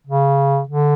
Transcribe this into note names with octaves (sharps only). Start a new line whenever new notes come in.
C#3
D3